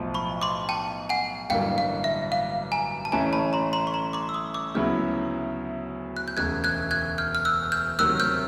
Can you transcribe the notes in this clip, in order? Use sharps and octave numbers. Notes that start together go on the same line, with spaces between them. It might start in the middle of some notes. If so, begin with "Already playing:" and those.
Already playing: B1 A2 F3
B5 C#6
C6 D6
G5 A5
F#5 G#5
A1 G2 D3 F#3 A#3 F5 G5
F5
E5
F5
G#5 A#5
A5
A1 A2 E3 A3 C#4 G#5 A#5
A5 B5
A#5 C6
A#5 C6
C#6
A#5 C6
C6 D6
E6
C#6 D#6
D6 E6
D2 C#3 F#3 B3 E4 F6 G6
F#6
G6
E1 D2 C#3 F#6 G#6
F#6 G#6
F#6 G#6
F6 G6
F6
E6 F#6
F6 G6
D2 C3 D#3 F#3 E6 F#6
F6 G6